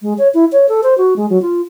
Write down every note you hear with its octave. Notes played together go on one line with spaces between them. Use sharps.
G#3
C#5
E4
C#5
A4
C5
F#4
G#3
F#3
F4